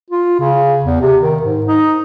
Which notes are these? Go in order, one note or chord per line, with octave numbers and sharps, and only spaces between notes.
F4
C#3
E2
C3
D#3
G#2
D#4